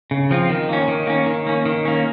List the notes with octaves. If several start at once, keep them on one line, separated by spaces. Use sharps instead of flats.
C#3
F3 C4 F4
D#3
A#3 C#4
D#3
A#3 C#4
D#3
A#3 C#4
D#3
A#3 C#4